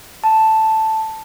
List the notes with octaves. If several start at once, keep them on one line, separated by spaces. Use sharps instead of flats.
A5